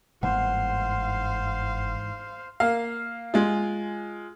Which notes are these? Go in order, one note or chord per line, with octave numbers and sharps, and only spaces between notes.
G1 G#2 E3 A#3 C5 F5 F#5
A#3 F5
G#3 F4